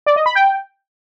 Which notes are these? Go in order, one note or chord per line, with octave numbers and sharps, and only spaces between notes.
D5
D#5
B5
G5